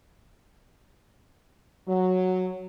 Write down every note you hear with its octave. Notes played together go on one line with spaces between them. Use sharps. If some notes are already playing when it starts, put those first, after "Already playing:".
F#3